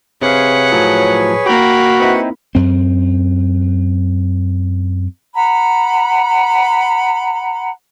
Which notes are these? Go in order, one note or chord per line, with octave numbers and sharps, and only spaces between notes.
C3 G#4 B4 C#5 F5 F#5
A2 F3 F#3
A#3 F#4 G5 A#5 B5
C4 D#4 E4 B4 F#5
F#2 C4
F#5 A#5 B5